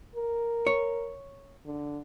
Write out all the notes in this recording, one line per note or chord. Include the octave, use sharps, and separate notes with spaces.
A#4
C#5
D3